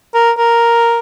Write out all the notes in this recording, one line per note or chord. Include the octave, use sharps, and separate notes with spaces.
A#4
A#4